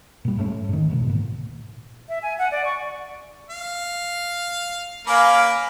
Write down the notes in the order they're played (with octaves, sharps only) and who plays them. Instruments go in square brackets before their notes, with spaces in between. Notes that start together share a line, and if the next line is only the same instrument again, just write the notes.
[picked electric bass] A#2 G3
G#2 A3 A#3 C#4
G#2 D#3
D2 G#2 B2
A#2
[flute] E5
G#5
F#5
D5
C#6
[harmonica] F5
[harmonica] A#3 C#4 B4 [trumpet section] F5 G#5 D6